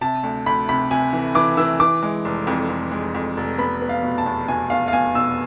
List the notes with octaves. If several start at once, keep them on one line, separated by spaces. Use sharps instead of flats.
C3 A5
D2
D2 B5
C3 B5
C3 G#5
E3
E3 D6
E3 E6
E3 D6
G#3
F1
F2
F2
G#3
F2
F1
B3 B5
B3
F5
B2
A5
E2
B2 G#5
E2 F5
F5
B2 G#5
B2 E6